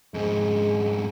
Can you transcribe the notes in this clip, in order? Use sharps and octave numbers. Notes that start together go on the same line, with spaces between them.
F2 G#2 G#3